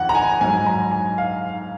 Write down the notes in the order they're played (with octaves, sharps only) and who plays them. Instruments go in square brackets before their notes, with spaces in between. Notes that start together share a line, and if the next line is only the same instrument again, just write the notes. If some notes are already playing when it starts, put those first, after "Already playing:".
Already playing: [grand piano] F2 D#3 F#5
A#5
G#5
G#2 F#3 G#5
A#5
G#5
F5